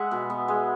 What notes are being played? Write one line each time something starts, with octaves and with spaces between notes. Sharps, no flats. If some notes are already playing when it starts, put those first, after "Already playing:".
Already playing: G#3 E5 F#5
B2
B3
G#3